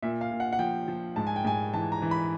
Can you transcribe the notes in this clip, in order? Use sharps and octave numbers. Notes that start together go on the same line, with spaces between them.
A#2 E5
F5
A#2
F#5
F#5
F3 G5
F3
G#2 A5
G#5
G5
G#2 G#5
E3 A5
A#5
E3
B5